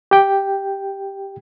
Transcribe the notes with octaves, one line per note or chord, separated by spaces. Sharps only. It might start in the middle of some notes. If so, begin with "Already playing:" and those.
G4 G5